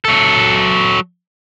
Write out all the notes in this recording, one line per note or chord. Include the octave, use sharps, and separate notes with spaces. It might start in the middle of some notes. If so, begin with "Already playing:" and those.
F#3 A4